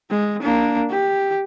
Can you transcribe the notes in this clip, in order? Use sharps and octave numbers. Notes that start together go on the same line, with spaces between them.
G#3
A#3 D4
G4